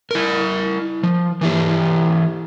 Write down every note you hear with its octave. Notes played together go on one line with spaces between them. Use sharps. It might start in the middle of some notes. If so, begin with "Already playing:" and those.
E4 A#4
F3
E3 E4 G4